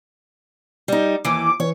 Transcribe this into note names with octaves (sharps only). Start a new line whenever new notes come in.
G3 D#4
D#2 E3 D6
E3 C#5